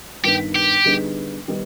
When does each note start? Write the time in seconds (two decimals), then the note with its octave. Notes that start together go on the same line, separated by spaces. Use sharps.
0.24 G2 D#3 B3 G4
0.55 G4
0.85 D3 G3 B3 D#4 G#4
1.48 D#3 G3 B3 D#4